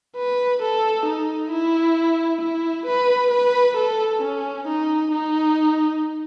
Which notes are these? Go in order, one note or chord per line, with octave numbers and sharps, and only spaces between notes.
B4
A4
D#4
E4
E4
B4
B4
A4
C#4
D#4
D#4